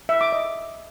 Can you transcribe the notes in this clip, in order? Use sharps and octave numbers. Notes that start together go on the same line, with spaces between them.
E5
D6
D#5